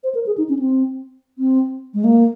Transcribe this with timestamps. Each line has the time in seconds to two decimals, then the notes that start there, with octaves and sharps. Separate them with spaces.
0.04 C5
0.14 A#4
0.26 G#4
0.38 D#4
0.49 C#4
0.59 C4
1.38 C4
1.94 G#3
2.04 A#3